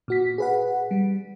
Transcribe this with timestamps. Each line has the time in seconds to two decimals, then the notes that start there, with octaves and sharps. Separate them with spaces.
0.08 A#2 F#4 B6
0.38 G#4 B4 F#5
0.91 G3